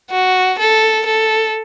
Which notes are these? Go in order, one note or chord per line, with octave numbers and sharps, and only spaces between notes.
F#4
A4
A4